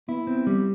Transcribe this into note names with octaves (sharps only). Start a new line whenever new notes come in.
B3 E4
C4
G3